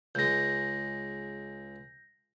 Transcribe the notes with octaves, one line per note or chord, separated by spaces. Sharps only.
C#2 G#3 G6 A#6